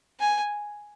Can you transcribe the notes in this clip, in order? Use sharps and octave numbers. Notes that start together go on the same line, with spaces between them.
G#5